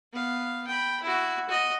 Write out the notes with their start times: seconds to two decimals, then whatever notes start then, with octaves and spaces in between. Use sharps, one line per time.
0.12 B3 F5
0.67 G5 B5
1.02 E4 F#4
1.49 F#4 D#5